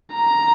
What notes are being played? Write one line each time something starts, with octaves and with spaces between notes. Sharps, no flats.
A#5